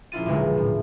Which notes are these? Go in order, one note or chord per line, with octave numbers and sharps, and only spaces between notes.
A#1 C#4 E4 F4 A6 D#7
D#1 B1 D3 G#3
A2